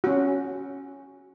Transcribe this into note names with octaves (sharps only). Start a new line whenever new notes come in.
C#4 F#4